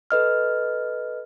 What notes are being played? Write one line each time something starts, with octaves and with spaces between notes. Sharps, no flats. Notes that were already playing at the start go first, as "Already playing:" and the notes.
A4 B4 D#5 F6